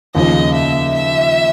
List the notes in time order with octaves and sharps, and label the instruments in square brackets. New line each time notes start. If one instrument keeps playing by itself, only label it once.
[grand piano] D#2 C#3 F3 [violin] D#5
[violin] E5
E5